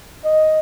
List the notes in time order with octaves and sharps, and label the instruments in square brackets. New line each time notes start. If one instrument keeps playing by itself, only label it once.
[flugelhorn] D#5